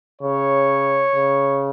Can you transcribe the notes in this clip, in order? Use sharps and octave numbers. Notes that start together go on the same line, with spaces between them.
C#3 C#5
C#3